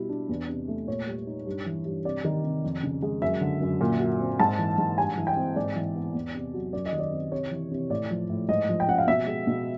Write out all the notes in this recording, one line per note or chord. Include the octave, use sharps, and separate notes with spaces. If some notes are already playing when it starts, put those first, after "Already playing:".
Already playing: B2 G3 E4
D4
E2
C3
A3
A#2 C#5
G3
D#4
G2
E3
G2
C3 D5
D#3
C3
F2
C#3
G#3
F#2 E5
D3
F#2
A#2
F#3
C4
G#2 A5
E3
G#2
G2 G#5
E3
G5
C4
G#2 D5
E3
B3
E2
C3
F#3
F#2 D5
D#5
D#3
D5
C4
C3 C#5
E3
C3
A2 D5
F3
A2
G#2 D#5
F3
G5
C#4 F#5
F5
B2 E5
G#3
B2